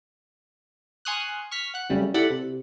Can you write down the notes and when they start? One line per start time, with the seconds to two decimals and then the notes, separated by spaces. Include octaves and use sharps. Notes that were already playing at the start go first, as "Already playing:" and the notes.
1.05 G#5 C6 C#6 D#6 F6 F#6
1.51 C#6 F6 B6
1.74 F#5 F#6
1.90 F2 C#3 F#3 G3 A3 C#4
2.14 E4 G4 A4 D5 F#5 B5
2.30 C3